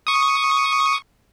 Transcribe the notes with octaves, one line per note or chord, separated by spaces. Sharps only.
C#6 D#6